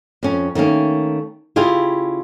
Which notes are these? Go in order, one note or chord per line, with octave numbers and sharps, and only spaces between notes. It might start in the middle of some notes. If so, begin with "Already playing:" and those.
F2 C#4
D#3 A3 A#3 C#4
C#3 E4 F4 G4 G#4